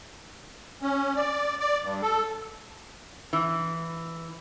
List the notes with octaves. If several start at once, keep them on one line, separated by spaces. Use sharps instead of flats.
C#4
D5
D5
G2
A4
E3